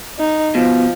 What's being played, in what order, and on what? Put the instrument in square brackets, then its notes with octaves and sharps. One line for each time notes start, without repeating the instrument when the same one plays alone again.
[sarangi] D#4
[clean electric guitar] B2 [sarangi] F3